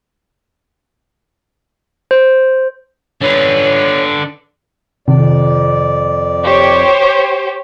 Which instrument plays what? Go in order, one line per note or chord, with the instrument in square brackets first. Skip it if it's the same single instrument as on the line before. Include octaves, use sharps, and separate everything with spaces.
[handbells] C5
[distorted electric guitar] D3 B4 [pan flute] C#5
[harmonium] F2 D5 [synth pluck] C3 D#3
[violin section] G4 C5 C#5